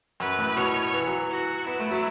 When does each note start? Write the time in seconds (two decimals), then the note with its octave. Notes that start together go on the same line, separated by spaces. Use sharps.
0.20 F#2 B4
0.38 A2
0.57 B2 C#5
0.94 E3
1.07 F#3
1.20 E3
1.30 F#4
1.67 B3 E4
1.80 A3
1.91 F#3